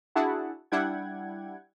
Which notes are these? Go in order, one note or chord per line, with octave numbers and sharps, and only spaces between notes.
D4 E4 F#4 G#4 F#5 A5
G3 D4 E4 F#5 G5 G#6